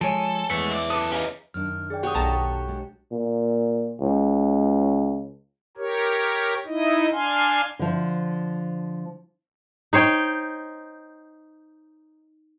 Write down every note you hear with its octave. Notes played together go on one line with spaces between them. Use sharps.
F3 G#3 A4 C#5 G#5 D7
E2 G#3 A3 F#5 B6
C4 D5
F#2 A4 B4 D6 D#6
C#4 D#4 G4 F5
F#2 D#3 D4 F6
G#4 D5 G5
F#4 G4 C#5 F#5 G5 D#6
B1 A4 A5 A#5
G#3 D4
A#2
C#2
G4 A#4 C#5
D#4 E4 D#5
D4 F5 G#5 C6
D3 F3
D#4 C5 C#5 G5